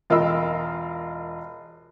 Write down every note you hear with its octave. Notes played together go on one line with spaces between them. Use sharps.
E1 F4 A#4 D#5 B5 E6